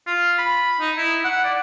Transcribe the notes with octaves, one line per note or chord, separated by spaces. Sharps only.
F4
B5
D#4
E4
F#5
D5